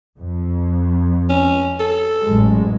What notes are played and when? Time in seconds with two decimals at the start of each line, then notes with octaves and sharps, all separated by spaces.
0.18 F2
1.30 C#4
1.80 A4
2.22 A1 F#2 G#3